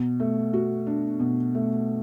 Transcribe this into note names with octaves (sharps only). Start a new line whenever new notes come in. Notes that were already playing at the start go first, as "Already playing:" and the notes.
Already playing: B2
A3
F#4
D4
B2
A3